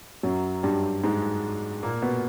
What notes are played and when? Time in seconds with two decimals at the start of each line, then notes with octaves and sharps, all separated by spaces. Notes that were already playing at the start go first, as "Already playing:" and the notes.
0.23 F#2 F#3
0.63 G2 G3
1.03 G#2 G#3
1.83 A#2 A#3
2.02 B2 B3